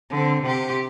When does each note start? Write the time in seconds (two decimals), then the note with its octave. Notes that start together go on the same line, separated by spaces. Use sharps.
0.10 D3 C4
0.42 C3 G4